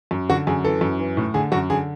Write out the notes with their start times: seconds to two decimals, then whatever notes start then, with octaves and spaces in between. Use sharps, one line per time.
0.11 F#2
0.30 D3 F#4
0.47 F#2 G#4
0.64 E3 A4
0.81 F#2
0.99 E3
1.17 A2
1.34 D3 G#4
1.52 F#2 F#4
1.70 D3 G#4